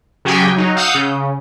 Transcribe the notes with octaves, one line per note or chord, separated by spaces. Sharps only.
C#3 F#3 G4 G#4 G5 G#5
F#3 D#4
F5 F#5 D#6 E6 G6
C#3